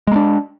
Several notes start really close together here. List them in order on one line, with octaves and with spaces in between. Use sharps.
G#3 A#3 D4